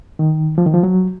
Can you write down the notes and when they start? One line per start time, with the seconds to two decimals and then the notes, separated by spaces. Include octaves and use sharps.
0.19 D#3
0.58 F3
0.66 D#3
0.74 F3
0.83 F#3